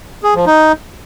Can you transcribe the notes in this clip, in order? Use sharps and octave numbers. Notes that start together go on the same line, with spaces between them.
G#4
F3
D#4